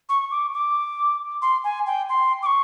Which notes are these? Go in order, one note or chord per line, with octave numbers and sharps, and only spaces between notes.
C#6
D6
D6
C6
G#5
G5
C6
D6
C#6